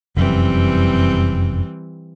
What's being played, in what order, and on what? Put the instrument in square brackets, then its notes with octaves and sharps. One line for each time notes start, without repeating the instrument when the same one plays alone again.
[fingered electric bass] F1 F#2 [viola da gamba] E3 G3 C4